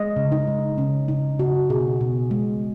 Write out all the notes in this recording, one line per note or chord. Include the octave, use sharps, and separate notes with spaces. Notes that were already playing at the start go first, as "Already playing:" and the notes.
Already playing: G#3 D#5
C#3
D#4
G#3
C#3 C#4
C#3 D#4
C#3 F#4
B2 G#4
B2
G#3